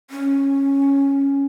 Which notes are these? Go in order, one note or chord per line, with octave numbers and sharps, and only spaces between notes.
C#4